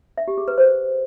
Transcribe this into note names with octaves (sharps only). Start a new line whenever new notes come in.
E5
G4
G#4
B4
C5